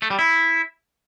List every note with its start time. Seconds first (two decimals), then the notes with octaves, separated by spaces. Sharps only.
0.02 A3
0.10 G3
0.19 E4